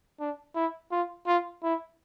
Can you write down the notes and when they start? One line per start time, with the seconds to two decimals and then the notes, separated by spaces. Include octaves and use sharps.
0.20 D4
0.55 E4
0.92 F4
1.27 F4
1.63 E4